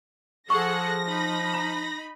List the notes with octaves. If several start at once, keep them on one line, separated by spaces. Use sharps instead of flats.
F3 G#4 A4 F#5 C#6 A#6
D#4 B5
A#5